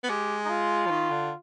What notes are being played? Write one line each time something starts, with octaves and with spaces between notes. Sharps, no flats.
B3
G#3 G4
D#4
F4
F3
D#3
D3